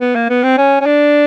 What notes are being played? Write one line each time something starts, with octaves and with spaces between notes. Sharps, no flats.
B3
A#3
B3
C4
C#4
C#4
D4